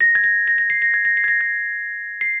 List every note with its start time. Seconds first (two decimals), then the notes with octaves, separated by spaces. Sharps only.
0.01 A#6
0.15 G#6
0.24 A#6
0.48 A#6
0.58 A#6
0.70 C7
0.82 A#6
0.94 G#6
1.05 A#6
1.17 C7
1.24 G#6
1.28 A#6
1.41 G#6
2.21 C7